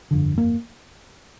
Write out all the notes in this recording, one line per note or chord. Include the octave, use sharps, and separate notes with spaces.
G1 F2 D3
A#3